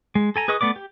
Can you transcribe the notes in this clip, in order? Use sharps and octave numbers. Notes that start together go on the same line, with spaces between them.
G#3
A4 G#5 A#5
G#4 B4 D#5 C#6 D#6
A3 B3 D5 D6
G4